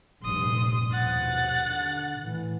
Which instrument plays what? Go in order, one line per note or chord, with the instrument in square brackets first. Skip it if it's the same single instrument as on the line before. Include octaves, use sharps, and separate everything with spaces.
[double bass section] F1 G2 A#2 [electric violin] C6 D#6
[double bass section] D#2 B2 F3 [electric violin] F#5 A6
[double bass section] D3
A2 E3